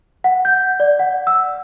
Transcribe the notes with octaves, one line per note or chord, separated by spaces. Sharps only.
F#5
G6
D5
F#5
E6